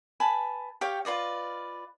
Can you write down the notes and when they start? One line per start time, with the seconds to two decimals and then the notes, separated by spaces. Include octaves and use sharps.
0.20 B4 G#5 A5 B5
0.81 G4 C#5 F5 G5
1.05 F4 B4 D5 D#5